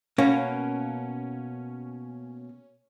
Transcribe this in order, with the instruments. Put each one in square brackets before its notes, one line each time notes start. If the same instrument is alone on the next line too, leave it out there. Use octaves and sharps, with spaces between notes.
[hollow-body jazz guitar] B2 A#3 [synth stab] C#4